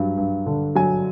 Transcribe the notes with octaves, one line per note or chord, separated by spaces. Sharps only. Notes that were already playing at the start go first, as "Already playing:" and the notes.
Already playing: G2 F#3
G2
D3
F#3 G#5